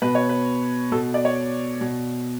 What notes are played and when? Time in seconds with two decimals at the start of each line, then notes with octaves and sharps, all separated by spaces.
0.02 B2 B4
0.15 C#5
0.29 B4
0.92 B2 A4
1.14 D5
1.25 C#5
1.81 B2